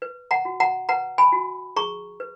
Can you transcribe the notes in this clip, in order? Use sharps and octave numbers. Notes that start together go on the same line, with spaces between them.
B4
F#5 A#5
F#4
F#5 A#5
B4 F#5 A#5
G#5 B5
F#4
G#4 A#5 C#6
B4